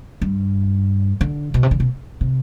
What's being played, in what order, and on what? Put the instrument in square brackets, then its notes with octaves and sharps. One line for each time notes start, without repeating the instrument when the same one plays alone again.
[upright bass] G2
D3
B2
C3
D3
B2
C3